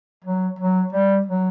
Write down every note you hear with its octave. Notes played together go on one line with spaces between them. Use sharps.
F#3
F#3
G3
F#3